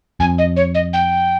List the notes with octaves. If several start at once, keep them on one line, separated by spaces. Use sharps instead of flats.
F2 G#5
D#5
C#5
D#5
G5